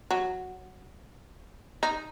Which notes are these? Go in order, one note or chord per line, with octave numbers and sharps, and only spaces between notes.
F#3
D#4